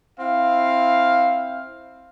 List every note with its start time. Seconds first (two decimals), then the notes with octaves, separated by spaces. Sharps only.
0.20 C4 E4 F5